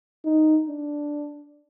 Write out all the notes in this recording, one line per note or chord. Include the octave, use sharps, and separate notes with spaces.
D#4
D4